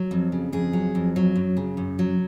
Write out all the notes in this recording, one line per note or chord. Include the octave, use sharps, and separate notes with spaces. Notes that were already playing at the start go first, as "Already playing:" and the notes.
Already playing: F#3
F2
C#3
F2 G#4
F#3
F2
F#3
F#2
C#3
F#2
F#3